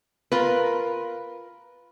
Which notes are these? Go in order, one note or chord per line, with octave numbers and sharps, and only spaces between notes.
F4 A#4 B4